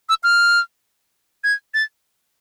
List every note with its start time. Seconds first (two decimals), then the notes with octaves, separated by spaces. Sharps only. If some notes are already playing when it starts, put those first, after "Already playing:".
0.09 E6
0.24 F6
1.44 G#6
1.74 A6